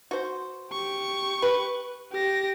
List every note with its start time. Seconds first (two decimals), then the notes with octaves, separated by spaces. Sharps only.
0.11 F#4 C5
0.72 G4 C#6
1.42 B4
2.12 G4 A#6